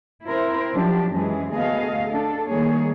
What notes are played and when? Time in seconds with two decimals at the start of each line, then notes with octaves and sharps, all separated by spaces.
0.26 C4 E4 A#4 C5
0.74 F3 F#3 D4 G4
1.12 F#2 E3 G#3 G#4
1.52 D2 A3 B3 G#4 D#5 F5
2.08 D4 A4
2.48 D#3 G3 A3 A#3 G#4 C#5